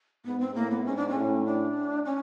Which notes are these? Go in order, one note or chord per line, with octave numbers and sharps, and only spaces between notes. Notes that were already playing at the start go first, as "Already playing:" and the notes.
G#2 B3
C4
A2 A#3
B3
G#2 C#4
D4
C#4
A2
D4
C#4